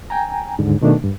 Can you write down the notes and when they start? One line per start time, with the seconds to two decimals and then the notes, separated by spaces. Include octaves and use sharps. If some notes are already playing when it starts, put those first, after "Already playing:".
0.10 G5 G#5 A#5
0.58 D#2 G#2 D3
0.82 B2 D#3 A3 D4
1.04 G2